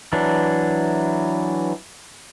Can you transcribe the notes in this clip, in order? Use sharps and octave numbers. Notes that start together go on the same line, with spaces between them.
E3 F#3 D4